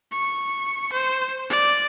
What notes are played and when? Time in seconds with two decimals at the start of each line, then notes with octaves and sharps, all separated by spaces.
0.12 C#6
0.93 C5
1.50 D5